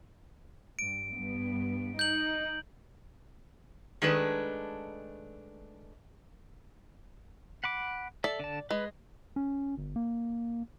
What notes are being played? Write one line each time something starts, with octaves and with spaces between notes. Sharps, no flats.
G2 D7
G2 B3
D#4 G6 F#7
D#3 G#3 A3 D4 B4
F#5 B5 D6
A4 D5 E5
D3 A5
G#3 B4
C#4
G1
A#3